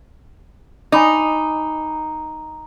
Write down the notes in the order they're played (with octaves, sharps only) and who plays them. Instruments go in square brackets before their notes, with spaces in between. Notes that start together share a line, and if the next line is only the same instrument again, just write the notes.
[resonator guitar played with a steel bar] D#4 [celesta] G#5 B5 D6